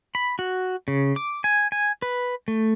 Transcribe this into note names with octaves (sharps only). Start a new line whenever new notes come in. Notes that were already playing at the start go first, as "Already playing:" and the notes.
B5
F#4
C#3
D6
G#5
G#5
B4
A3